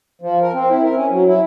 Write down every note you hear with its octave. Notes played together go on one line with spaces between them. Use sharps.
F3
A#4
C4
E4
A#4
C#4
F#3
E4